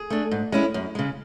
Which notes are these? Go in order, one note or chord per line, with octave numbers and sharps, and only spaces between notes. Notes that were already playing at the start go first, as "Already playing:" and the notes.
Already playing: G#4
A3 D4
G#2
G#3 C#4 E4
F#2
C#3 G#3